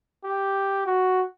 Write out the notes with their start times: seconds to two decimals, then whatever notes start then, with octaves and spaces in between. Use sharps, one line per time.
0.24 G4
0.86 F#4